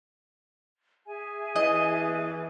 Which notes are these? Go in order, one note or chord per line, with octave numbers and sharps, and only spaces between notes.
G#4 E5 G#5
E3 D#5